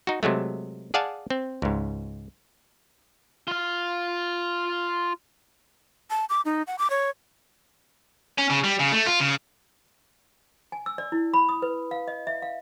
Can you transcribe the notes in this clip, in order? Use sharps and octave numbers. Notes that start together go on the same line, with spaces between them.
D#4 F#4
C3 F#3 G#3 A3
G#4 D5 F5 F#5 G#5 A5
C4
C#2 G#2
F4 F5
A5
D6
D#4
F#5
D6
C#5
C#4
C#3
G3
C#3
A3
F4
C#3
G#5
E6
D5
E4
B5
D#6
B4
F5
D#5
E5
F5